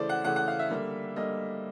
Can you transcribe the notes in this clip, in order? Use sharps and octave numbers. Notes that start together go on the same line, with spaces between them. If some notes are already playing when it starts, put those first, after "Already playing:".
Already playing: C#3 E3 A3 C5 D5
F#5
C#3 E3 A3 F#5
F#5
F5
E5
D3 G3 A#3
D3 G3 A#3 D#5